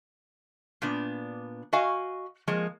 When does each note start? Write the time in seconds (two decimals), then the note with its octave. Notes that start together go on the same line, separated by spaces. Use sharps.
0.82 A#2 B3 D4
1.73 F#4 D#5 F5 G#5
2.47 F3 G#3 A#3